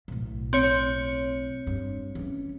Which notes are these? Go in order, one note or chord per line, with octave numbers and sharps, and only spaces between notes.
B1 A2
C4 C#5 C#7
G2
E3 C#4